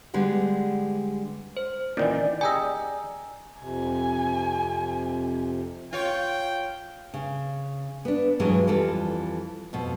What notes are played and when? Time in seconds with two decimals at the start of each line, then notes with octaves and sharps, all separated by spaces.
0.14 D3 G3 G#3 B3
1.57 C5
1.97 A#2 D#3 E3 C#4 D5
2.41 G4 G#4 D#5 G#5 A#5 E6
3.60 F2 C3 G#5
5.93 F4 C#5 G5
7.14 C#3
8.05 B3 D4
8.39 G2 B2 E3 F#3 G#3 G#4
8.67 F2 E3 G3 F4 A4
9.73 F2 B2